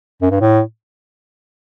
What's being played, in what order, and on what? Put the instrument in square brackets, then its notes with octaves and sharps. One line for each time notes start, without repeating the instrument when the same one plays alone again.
[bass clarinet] F#2
G2
A2